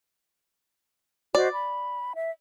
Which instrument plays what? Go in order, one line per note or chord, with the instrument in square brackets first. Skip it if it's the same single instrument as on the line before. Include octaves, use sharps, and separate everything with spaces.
[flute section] F#4 C5 D#5 [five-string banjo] D5
[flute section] B5
E5